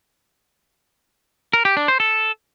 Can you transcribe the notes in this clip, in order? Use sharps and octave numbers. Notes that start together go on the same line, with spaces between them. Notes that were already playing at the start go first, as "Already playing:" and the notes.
A#4
G4
D4
C5
A4